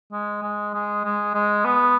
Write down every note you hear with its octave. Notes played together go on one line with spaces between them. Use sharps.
G#3
G#3
G#3
G#3
G#3
B3